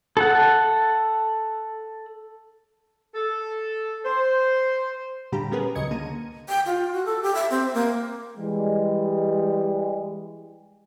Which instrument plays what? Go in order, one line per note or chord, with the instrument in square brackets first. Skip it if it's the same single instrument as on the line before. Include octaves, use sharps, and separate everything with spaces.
[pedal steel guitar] A4 F#5
[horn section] A4
C5
[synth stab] A#2 D3 G3 G4 A#5 B5
G3 B3 C#4 G#4 A#4 B4
C#2 C#3 F#3 D#5 G#6 C#7
D3 A#3 A#5 D#7
[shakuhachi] G5
F4
F#4
A4
G4
E5
C4
A#3
[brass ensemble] E3 G3 G#3